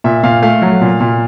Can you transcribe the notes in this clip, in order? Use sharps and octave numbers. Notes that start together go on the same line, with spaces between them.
A#2 E5
A#2 F5
A3 F5
F#3
A#2
A#2